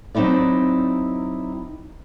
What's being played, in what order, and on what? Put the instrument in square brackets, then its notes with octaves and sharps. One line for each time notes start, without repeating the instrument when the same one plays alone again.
[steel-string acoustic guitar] F#3 C4 D#4 E4 D5